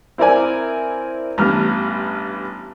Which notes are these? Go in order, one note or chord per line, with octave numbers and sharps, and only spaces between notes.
C4 E4 A#4 D5 G#5
A1 G2 B3 F6